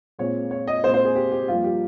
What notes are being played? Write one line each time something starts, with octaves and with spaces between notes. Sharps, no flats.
A#2 G#3 C4 C#5
C#5
D#5
A#2 G#3 C4 C5
C5
G#4
G4
G4
G2 F3 A#3 F4
G4